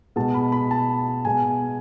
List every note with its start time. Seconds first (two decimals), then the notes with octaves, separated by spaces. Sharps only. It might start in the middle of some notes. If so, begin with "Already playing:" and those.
0.16 B2 G#3 B3 A5
0.34 B5
0.52 B5
0.71 A5
1.25 B2 G#3 B3 G#5